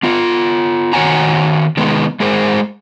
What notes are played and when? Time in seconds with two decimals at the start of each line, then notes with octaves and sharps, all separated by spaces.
0.03 B3 F4
0.93 D#3 F#4 C#5 F#5 G#5 A#5
1.77 D#3 G#3 B3
2.20 G#3 G#4 A#4 C5